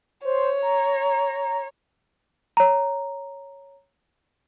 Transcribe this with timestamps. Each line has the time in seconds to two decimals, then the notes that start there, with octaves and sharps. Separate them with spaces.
0.25 C5 C#5
0.63 A#5
2.57 C#5 A#5